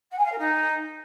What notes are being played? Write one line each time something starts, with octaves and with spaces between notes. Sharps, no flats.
F#5
G#5
F5
A#4
D#4